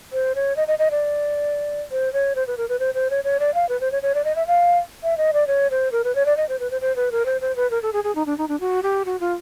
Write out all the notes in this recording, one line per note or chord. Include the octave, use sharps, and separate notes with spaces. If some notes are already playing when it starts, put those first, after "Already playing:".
C5
C#5
D#5
D#5
D#5
D5
C5
C#5
C5
B4
A#4
B4
C5
C5
C#5
C#5
D5
F5
B4
C5
C#5
C#5
D5
D#5
E5
F5
E5
D#5
D5
C#5
C5
A#4
B4
C#5
D5
D#5
C5
B4
C5
C5
B4
A#4
C5
C5
B4
A#4
A4
G#4
G#4
D#4
D4
D#4
D4
F#4
G4
F#4
F4